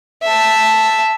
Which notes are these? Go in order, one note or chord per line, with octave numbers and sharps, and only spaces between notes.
E5 A5